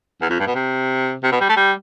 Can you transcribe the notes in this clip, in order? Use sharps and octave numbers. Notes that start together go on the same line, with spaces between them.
E2
F2
G2
B2
C3
C3
B2
G3
A3
G3